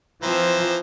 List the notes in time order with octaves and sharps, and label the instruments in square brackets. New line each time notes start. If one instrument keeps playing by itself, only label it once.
[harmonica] E3 C5 A#5 [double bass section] F3 [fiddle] C4 E6